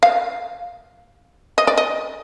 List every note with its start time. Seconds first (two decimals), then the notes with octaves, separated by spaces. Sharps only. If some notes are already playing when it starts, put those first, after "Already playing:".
0.03 F5
1.58 D#5
1.67 D5
1.78 D#5